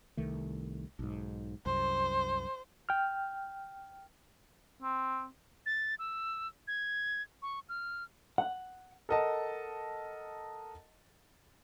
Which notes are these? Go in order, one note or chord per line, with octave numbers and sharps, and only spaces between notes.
C2 D#3 A3
B1 G#2
C2 F#2 C5
G5 F6
C4
A6
E6
G#6
C#6
F6
F#5
A4 A#4 D#5 F#5 A5